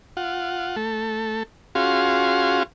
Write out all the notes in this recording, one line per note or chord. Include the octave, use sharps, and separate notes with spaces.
F4 F#5
A3 A4
C#4 F4 F#4 G#4 F5 C6